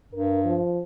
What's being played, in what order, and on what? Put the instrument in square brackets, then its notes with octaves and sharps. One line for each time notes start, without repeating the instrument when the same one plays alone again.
[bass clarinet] G2 [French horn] A#4
[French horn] F3